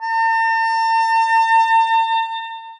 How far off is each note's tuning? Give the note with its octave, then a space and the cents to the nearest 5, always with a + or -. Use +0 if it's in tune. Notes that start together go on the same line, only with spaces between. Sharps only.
A5 +45